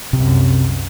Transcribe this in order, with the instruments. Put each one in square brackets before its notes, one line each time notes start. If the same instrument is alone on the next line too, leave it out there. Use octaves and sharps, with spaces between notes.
[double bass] C2 F#2 [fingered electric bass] C3